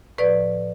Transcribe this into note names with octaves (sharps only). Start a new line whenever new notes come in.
A2 F3 B4 D5